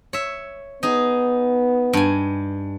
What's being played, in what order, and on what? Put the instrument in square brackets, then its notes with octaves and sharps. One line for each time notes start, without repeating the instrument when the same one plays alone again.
[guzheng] C#5 E5
[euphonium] B3 [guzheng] D#4 G#4
[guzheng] G2 G#5